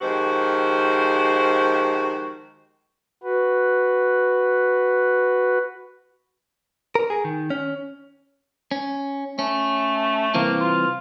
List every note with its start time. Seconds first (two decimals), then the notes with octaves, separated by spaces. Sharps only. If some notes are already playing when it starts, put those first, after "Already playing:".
0.01 D#3 F3 G#3 F#4 G4 C5
3.23 F#4 B4
6.95 A#4
7.10 G#4
7.25 D#3
7.50 C#4
8.71 C#4
9.39 A3 C#4
10.34 C2 E3 A#3 C4
10.60 F4